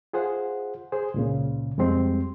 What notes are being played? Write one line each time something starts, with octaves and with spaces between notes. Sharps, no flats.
F4 G#4 C5 F#5
G#4 C5
C#2 A#2 C#3
F2 G3 G#3 C4 C6